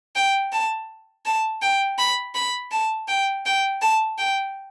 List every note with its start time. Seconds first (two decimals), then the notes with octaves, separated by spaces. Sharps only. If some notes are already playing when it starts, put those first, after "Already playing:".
0.15 G5
0.52 A5
1.25 A5
1.62 G5
1.98 B5
2.35 B5
2.71 A5
3.08 G5
3.46 G5
3.82 A5
4.18 G5